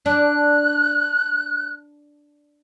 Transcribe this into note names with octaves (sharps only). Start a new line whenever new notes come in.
D4 F#6